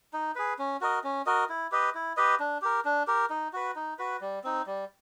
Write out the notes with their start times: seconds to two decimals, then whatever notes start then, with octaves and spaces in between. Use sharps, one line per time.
0.13 D#4
0.36 G#4 B4
0.59 C#4
0.81 F#4 A#4 D#5
1.04 C#4
1.26 F#4 A#4 D#5
1.49 E4
1.72 G4 B4 D#5
1.95 E4
2.17 G4 B4 D#5
2.40 D4
2.62 G4 A#4
2.85 D4
3.07 G4 A#4
3.30 D#4
3.53 F#4 B4
3.76 D#4
3.99 F#4 B4
4.21 G3
4.44 C4 D#4
4.67 G3